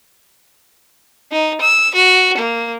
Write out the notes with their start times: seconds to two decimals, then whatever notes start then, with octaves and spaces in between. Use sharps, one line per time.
1.32 D#4
1.61 E6
1.95 F#4
2.37 A#3